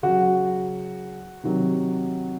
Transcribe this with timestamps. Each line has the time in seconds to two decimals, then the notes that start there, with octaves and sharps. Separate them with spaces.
0.03 C#3 F#3 F#4
1.44 C3 D#3 F#3